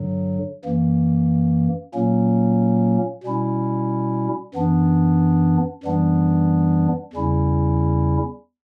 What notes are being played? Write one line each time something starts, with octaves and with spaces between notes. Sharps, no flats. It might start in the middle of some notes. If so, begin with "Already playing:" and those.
Already playing: G2 D3 F#3
F#2 E3 A#3
A#2 F#3 A#3 C#4
B2 G3 C#4 E4
F#2 E3 B3 D4
F#2 E3 G3 B3 D4
E2 C#3 G3 C#4 E4